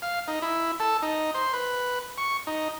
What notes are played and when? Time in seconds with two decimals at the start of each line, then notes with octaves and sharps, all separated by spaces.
0.02 F5
0.28 D#4
0.42 E4
0.80 A4
1.02 D#4
1.34 C5
1.53 B4
2.18 C#6
2.47 D#4